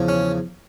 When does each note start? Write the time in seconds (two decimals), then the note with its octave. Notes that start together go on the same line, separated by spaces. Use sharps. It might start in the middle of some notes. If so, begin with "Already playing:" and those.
Already playing: E2 C#3 F3
0.09 C#4